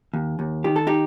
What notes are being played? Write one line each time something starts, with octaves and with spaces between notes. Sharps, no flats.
D#2
D#2
D#3 G4
A4
D#4 G4